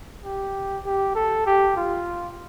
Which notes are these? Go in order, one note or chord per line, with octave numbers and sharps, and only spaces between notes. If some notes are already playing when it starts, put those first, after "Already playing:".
G4
G4
A4
G4
F4